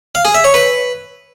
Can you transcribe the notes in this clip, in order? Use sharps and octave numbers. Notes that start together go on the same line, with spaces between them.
F5
G#4
E5
C#5
B4